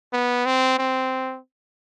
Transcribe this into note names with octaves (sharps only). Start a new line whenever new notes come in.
B3
C4
C4